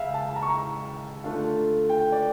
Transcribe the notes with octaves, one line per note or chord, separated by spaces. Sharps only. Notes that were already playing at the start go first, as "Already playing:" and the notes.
Already playing: C#2 C#3 E5 F5
A5
A#5
C#6
A#5
D3 A3 D4 F4
G5
D5